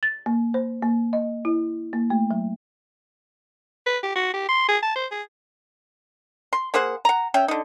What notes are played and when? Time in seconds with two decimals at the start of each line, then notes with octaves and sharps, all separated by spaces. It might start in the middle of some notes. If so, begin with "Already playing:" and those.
0.03 A6
0.26 A#3
0.54 C5
0.82 A#3
1.13 D#5
1.45 E4
1.93 A#3
2.10 A3
2.31 F#3
3.86 B4
4.03 G4
4.16 F#4
4.34 G4
4.49 C6
4.69 G#4
4.83 A5
4.96 C5
5.11 G#4
6.53 C6
6.74 A#3 G#4 C5 F#5
7.05 F#5 A#5
7.34 C#4 E5 G5
7.48 D3 D#4